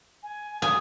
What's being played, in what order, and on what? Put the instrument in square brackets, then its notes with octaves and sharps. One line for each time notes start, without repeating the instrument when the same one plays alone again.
[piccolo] G#5
[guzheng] G#5 [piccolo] D#6